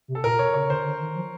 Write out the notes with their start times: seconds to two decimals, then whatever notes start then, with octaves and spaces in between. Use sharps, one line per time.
0.08 C3
0.15 A4
0.23 A#2 A#4
0.39 B2 C#5
0.54 C#3 C#5
0.69 D3 C5
0.85 D3
1.00 D#3
1.15 F3